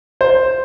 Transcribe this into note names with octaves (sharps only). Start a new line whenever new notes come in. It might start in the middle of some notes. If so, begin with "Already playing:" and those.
C5